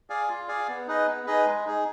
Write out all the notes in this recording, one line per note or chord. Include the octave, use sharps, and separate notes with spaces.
G#4 D5 F5 G#5
F4
G#4 D5 F5 G#5
B3
D#4 G#4 B4 D#5
B3
D#4 G#4 B4 D#5
G#3
D#4 G#4